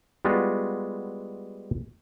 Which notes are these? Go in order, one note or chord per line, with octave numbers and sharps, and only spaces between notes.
G3 G#3 B3 F4 F#4